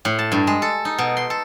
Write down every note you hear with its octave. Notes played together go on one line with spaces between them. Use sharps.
A2
A5
G2
G#3
A4
D#4
B2
C6
A4